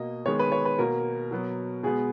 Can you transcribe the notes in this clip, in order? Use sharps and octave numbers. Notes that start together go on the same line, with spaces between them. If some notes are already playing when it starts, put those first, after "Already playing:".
Already playing: B2 A#3 D#5
D#3 G#3 B3 C#5
B4
C#5
B4
B2 A#3 A#4
B2 F#3 B3
B2 G#3 B3 G#4